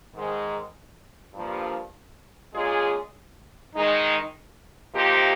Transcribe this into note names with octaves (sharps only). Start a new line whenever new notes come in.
G#2 D#3 G#3
G2 F3 A#3
A#2 G#3 C#4 F4 G#4
D#3 G#3 D#4
C3 F3 A#3 D#4 G4